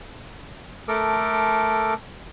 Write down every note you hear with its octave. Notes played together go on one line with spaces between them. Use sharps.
A3 A4 A#4 D6